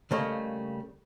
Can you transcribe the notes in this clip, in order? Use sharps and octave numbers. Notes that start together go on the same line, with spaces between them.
C#3 G3 A3 A#3 C#5 D#5